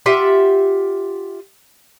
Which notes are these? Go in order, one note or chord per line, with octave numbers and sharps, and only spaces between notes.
F4 G4 E5 F#5